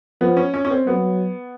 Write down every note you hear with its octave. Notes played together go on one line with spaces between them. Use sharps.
F3 B3
C#4
C#4
C#4
C4
F#3 B3